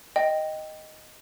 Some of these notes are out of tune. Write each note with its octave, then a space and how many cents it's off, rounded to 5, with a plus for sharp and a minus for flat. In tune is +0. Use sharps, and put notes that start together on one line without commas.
D#5 +0 G5 +0